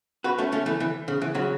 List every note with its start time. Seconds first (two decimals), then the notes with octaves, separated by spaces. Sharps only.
0.24 F#4 B4
0.38 A3 C#4
0.52 A3 C#4
0.66 E3 A3
0.80 E3
1.08 C#3
1.22 E3
1.35 C#3 F#3